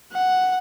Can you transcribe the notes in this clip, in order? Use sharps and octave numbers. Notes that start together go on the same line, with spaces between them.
F#5